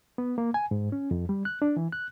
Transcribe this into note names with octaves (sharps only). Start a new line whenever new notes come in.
B3
A#3
G#5
G#2
C#4
F2
G3
F#6
D4
E3
F#6